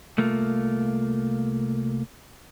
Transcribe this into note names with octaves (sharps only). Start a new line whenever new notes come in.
C2 A3 A#3 F4